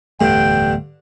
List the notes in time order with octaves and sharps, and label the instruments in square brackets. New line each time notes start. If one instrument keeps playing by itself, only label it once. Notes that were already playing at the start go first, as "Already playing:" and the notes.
[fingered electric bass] D1 E2 A3 [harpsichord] G2 D3 [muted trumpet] G5